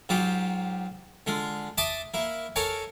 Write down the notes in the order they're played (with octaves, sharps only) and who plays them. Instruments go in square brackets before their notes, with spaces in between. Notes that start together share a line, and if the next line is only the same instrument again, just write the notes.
[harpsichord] G#2 F#3 F4 G4
D3 G#3 F4
E5 A5 C6 D6 D#6
A#3 E4
A4 A#4 C#5 F5 G#5